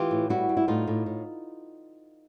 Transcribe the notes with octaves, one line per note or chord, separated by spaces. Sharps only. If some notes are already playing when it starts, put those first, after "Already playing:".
Already playing: E3 F4 G4
A2
G3 E4 F#4
G3
E4
A2 D#4 F4
A2
A2